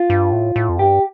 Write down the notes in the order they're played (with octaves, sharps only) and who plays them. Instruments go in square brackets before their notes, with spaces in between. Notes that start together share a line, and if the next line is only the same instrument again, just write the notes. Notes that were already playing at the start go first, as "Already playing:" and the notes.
Already playing: [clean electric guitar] F4
[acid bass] G2
A2
A2
F2
[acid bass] G2 [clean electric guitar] G4